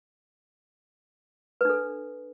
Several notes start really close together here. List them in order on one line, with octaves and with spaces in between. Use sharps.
B4 D4 A4